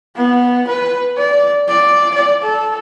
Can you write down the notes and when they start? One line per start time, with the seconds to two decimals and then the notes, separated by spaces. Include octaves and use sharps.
0.16 B3
0.68 B4
1.17 D5
1.68 D5
2.14 D5
2.43 A4